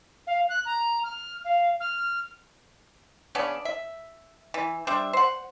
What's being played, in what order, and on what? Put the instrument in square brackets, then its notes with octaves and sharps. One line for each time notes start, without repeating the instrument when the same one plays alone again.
[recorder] F5
F#6
A#5
F6
F5
F6
[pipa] C#3 B3 C#4 D4
E5
E3
G3 D4 C5 E5
C5 F#5